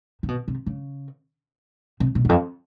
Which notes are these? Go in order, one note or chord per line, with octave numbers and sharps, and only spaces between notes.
C3
B2
C3
C#3
C3
B2
E2
F2